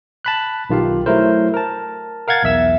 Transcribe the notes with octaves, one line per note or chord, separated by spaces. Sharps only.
A5 B5 F#6
B1 D#3 F4 G4 F5
F#3 A3 E4 A#4 C5
A#4 A5
A#4 F5 F#5 G#6 A6
B1 E2 E5 E6